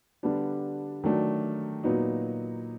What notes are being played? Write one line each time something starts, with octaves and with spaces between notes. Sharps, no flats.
D3 G3 B3 D4
D#3 F#3 A3 D4
A#2 F#3 B3 D#4